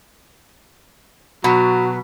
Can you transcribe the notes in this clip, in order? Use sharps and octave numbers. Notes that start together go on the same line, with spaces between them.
B2 F#3